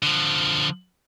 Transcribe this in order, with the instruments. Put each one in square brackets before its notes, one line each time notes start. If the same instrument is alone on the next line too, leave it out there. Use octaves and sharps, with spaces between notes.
[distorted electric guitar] D3 F3